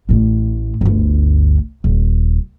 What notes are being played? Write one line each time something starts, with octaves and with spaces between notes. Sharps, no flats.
A1 A2
G1 D2
D#1